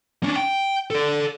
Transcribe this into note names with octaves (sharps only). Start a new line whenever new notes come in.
C#4 D4
G5
A4 D5